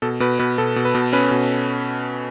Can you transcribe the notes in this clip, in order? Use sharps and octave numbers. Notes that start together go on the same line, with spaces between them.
B2 A4
B2 B4
B2 B4
B2 A4
B2
B4
B2
C#4 B4
B2